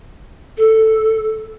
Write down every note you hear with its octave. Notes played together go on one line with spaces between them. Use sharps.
A4